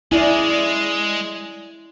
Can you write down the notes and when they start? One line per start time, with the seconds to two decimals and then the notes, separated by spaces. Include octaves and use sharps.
0.12 G#3 C#4 E4 D5 G#5